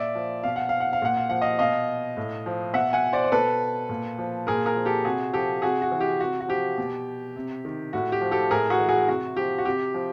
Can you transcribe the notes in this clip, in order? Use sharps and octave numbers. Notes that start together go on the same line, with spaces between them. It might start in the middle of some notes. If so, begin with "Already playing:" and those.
Already playing: A#2 D5 E5
F3
B2 F5
F#5
F5
F#5
F5
A#2 F#5
F5
F3 F#5
D#5 F5
B2 D#5 F5
A2
F3
B2 E5 F#5
F#5 G#5
C5 D5
C5
B2 A4 B4
A#2
F3
A#2 G#4 A#4
G#4 A#4
F3
G4 A4
C3 F#4 G#4
F3 G4 A4
C3 F#4 G#4
F#4
E3
G4
C3 F#4
F#4
F3 G4
B2
C3
D#3
A2 F#4
G4
F3
G4 A4
A2 G#4 A#4
F#4 G#4
E3
F#4 G#4
C3 F#4
F3 G4
F#4
C3 G4
F3